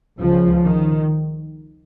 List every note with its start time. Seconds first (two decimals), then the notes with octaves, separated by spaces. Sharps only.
0.18 C#2 C#3 F3
0.65 D#3